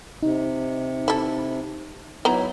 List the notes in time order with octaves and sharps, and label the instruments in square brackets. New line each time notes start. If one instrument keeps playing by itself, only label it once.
[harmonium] C3 [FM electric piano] D#4
[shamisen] E4 A4
[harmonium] F#3 D#4 E4 [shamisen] B3 A#5